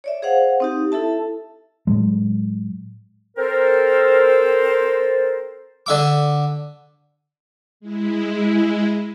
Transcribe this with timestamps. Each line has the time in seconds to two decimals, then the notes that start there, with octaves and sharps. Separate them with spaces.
0.04 C#5 D5 E5
0.22 G#4 C5 F5 F#5
0.60 C4 D#4 G4
0.92 E4 A4 E5 A5
1.87 A2 F#3 G#3
3.37 C4 A4 A#4 C5
5.86 D3 E5 D6
7.80 G#3 E4